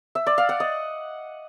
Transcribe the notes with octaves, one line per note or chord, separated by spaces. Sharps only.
E5
D5
F5
F#5
D#5